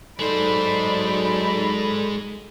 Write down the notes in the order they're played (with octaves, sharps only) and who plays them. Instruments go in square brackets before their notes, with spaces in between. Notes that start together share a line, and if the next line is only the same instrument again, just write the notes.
[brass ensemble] F#3 D#4 [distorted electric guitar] G#3 C5 [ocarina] A4 [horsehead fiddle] D5 B5